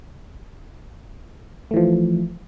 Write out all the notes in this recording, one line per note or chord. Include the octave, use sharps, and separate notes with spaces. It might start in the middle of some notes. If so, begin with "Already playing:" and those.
E3 F3 A3